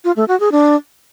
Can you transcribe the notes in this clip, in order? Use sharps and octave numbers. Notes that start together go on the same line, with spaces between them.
F4
A3
F#4
G#4
D4